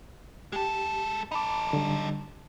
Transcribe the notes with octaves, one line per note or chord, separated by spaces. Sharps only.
G#3 G4 A4
D#4 A4 B5 D6
D3 G3